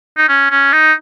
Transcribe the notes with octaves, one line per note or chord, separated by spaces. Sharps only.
D#4
C#4
C#4
D#4